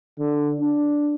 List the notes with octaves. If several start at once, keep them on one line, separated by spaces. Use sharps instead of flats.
D3
D4